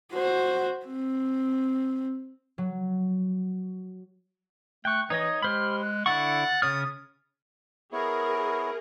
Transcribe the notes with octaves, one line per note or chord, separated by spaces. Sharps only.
F#4 C5
C4
F#3
A3 G5 C#6 F#6
E3 D#4 C#5 D#5 G#6
G#3 G4 C5 B5 F6
F#6
D3 E4 F#5 C#6 A6
C#3 C#5 D#6 F6
B3 E4 G#4 A#4 C#5